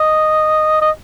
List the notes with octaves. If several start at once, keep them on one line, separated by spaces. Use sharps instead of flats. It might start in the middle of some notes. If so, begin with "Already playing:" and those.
Already playing: D#5
D#5